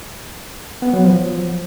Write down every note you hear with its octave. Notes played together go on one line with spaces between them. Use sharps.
B3
F#3
F3